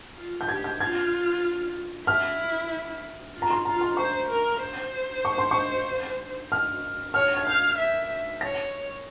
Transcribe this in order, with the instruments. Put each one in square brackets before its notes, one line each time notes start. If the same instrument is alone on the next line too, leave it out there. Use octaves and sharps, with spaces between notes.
[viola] F4
[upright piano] G6
[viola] G4 [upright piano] G#6
[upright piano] G6
[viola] F4 [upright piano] G#6
[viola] E4 [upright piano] F6
[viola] F4
[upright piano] A#5
C6
[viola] F4 [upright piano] A#5
[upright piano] C6
[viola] C5 [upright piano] C#6
[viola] A#4
C5
[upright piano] C#6
C6
C#6
F6
[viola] C#5 [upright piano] F6
[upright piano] G#6
[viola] F5 [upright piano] G6
[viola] E5
[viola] C#5 [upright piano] A#6